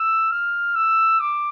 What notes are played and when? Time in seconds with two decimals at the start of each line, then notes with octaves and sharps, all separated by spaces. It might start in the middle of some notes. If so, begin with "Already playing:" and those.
Already playing: E6
0.31 F6
0.75 E6
1.20 D6